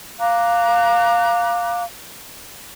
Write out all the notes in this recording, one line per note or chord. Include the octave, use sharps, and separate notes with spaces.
F5 A#5 D6 F#6